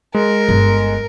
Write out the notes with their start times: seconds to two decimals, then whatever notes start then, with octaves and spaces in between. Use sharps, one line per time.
0.15 G#3 A#4
0.49 G1